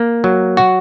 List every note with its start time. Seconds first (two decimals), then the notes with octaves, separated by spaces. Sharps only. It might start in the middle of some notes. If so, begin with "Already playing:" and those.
Already playing: A#3
0.24 F#3
0.57 F#4